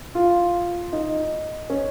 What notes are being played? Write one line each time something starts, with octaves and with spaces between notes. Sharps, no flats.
F4
D#4
C#4